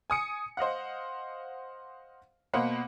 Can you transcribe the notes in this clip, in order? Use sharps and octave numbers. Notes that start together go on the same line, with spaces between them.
G#5 D#6 C#7
C5 D#5 F5 F#5
B2 A#3 C5 F5 F#5 B5